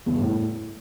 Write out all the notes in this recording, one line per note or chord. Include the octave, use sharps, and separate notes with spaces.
E2
G2
A2